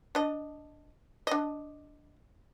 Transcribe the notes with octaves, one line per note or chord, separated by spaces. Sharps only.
D4 D#5
D4 D#5